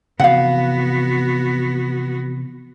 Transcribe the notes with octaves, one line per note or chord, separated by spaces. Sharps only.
C3 E3 F3 B3 F#4 F5 F#5